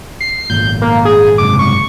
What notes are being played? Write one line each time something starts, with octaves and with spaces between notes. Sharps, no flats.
C7
G#1 A#2 G6
A#3
G#4
F#1 G#2 C3 D6
C#6